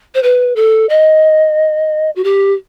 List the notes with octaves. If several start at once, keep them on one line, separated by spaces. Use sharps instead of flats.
C5
B4
A4
D#5
F#4
G4